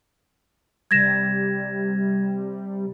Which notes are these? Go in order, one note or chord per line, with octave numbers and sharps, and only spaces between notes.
C3 G3 G#6 A#6 E7